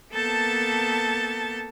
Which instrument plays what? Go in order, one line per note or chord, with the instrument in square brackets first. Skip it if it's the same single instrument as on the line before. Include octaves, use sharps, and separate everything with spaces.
[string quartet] A#3 B3 A4 A5 G6 A6